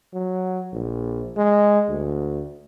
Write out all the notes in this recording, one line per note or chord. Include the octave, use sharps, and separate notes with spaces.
F#3
A#1
G#3
D2